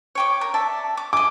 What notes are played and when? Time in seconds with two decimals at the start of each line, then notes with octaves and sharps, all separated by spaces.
0.15 C#5 G5 D6
0.41 A#4
0.54 D5 E5 A5
0.97 D6
1.13 D#5 G#5 D6